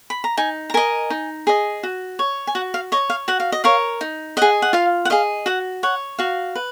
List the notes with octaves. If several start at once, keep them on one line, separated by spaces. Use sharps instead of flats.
B5
A#5
D#4 G#5
A#5
A#4 D#5 G#5
D#4
G#4 D#5
F#4
C#5
G#5
F#4 F#5
F5
C#5 D#5
F5
F#4 F#5
F5
D#5
A#4 C#5 F5
D#4
G#4 D#5 F#5
F#5
F4 F5
F#5
G#4 D#5 F5
F#4 F#5
C#5 F#5
F#4 F5
B4